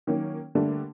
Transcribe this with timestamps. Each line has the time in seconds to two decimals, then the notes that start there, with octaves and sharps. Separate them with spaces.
0.07 D#3 F#3 A#3 C#4
0.55 D3 G3 A3 A#3 D4